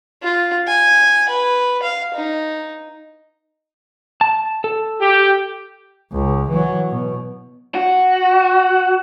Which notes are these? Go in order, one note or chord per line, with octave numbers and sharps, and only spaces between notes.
F4
G#5
B4
F5
D#4
A5
A4
G4
C#2
E3 F#3
B2
F#4